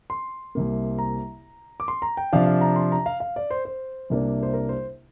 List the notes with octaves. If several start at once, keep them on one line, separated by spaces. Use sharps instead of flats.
C6
C2 C3 A#3
A#5
D6
C6
A#5
G5
C3 F3 D4 F5
F5
A#5
C6
A#5
F5
F5
D5
C5
C5
C2 C3 A#3 D4
C5
A#4
C5